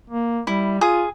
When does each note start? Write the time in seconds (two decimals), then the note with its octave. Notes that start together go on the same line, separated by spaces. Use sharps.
0.10 A#3
0.47 G3 E4
0.81 F4 G#4 D#6